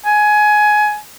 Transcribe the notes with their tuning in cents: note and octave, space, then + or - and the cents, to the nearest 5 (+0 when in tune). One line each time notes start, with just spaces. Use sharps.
G#5 +20